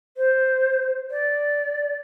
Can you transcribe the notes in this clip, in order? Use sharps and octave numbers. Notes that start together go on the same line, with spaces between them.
C5
D5